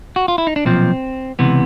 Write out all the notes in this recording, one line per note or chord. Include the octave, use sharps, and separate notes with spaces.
F#4
F4
E4
D#4
D4
B1 A#2 F3 C4
C#2 C3 E3 B3